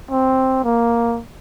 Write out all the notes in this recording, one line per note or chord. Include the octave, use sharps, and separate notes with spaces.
C4
A#3